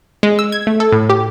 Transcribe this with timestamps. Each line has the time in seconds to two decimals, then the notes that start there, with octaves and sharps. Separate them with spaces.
0.23 G#3
0.39 E6
0.52 G#6
0.67 A3
0.80 A4
0.92 A2
1.09 G4